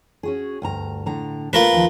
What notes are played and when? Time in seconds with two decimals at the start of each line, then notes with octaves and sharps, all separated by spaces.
0.23 C#4 F#4 G#4
0.62 D2 G2 A#5
1.06 A2 D3 A#5
1.53 A3 A#3 F4 A#4 B4
1.73 D#2 F3